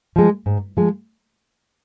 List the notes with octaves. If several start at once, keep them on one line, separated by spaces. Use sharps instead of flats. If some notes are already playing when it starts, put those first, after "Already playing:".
F3 G#3
G#2
F3 G#3